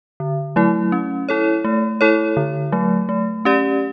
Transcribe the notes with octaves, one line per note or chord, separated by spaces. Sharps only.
D3
F#3 A3 E4
C#4
E4 A4 C#5
A3
E4 A4 C#5
D3
F#3 A3
A3
C#4 G4 D5